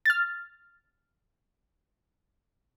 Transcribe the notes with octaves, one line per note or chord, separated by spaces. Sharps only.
F6 A6